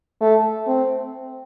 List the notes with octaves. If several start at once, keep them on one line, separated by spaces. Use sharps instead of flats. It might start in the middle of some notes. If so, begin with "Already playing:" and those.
A3
C4